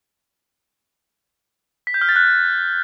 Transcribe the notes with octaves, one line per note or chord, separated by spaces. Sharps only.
B6
G6
F6
A6
F#6